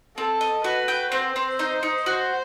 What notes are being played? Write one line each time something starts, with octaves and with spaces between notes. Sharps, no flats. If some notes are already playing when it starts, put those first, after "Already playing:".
C4 A4
D#5
F#4 B4
G5
C4 C5
C4
D#4
D#4
F#4 C5